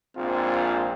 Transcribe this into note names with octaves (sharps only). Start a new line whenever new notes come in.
A#1 G#2 C4 F4